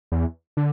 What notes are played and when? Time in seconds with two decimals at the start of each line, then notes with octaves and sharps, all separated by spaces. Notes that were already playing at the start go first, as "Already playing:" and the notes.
0.12 E2
0.57 D3